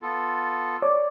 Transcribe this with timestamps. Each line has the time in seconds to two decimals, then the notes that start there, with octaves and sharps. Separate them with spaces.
0.02 B3 F4 A4
0.82 C#5 D5